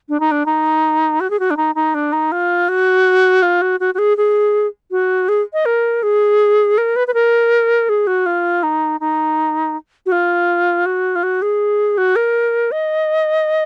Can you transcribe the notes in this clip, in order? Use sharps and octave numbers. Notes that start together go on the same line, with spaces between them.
D4
D#4
D4
D#4
F#4
G#4
F#4
D4
D#4
D#4
D4
D#4
F4
F#4
F4
F#4
F#4
F#4
G#4
G#4
F#4
G#4
D#5
A#4
G#4
A#4
B4
B4
A#4
G#4
F#4
F4
D#4
D#4
F#4
F4
F#4
F4
F#4
G#4
F#4
A#4
D#5